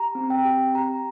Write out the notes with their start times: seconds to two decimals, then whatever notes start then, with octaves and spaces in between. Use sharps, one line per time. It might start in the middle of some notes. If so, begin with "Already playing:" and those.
Already playing: G4 A#5
0.15 C4
0.30 G5
0.45 G4
0.75 G4 A#5